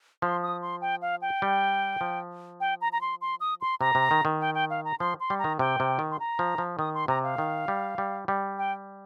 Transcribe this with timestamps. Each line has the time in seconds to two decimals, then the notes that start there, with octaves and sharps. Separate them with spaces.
0.22 F3 C6
0.43 D#6
0.62 C6
0.82 G5
1.02 F5
1.22 G5
1.42 G3
2.01 F3
2.60 G5
2.81 A#5
2.93 A#5
3.01 C6
3.21 C6
3.40 D#6
3.61 C6
3.81 C3 A#5
3.95 C3
4.11 D#3
4.25 D#3
4.41 G5
4.55 G5
4.70 F5
4.85 A#5
5.00 F3 C6
5.20 C6
5.30 G3
5.39 A#5
5.44 D#3
5.59 C3 G5
5.80 C3
5.99 D#3
6.11 C6
6.20 A#5
6.39 F3
6.58 F3
6.79 D#3 D#6
6.94 C6
7.08 C3 A#5
7.23 F5
7.38 D#3
7.68 G3
7.98 G3
8.28 G3
8.58 G5